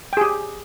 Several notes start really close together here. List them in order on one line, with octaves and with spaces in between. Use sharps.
G5 G#4 G4